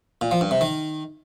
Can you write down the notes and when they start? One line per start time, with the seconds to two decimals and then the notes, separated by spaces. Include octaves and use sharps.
0.21 A#2
0.31 F3
0.41 G2
0.51 C3
0.61 D#3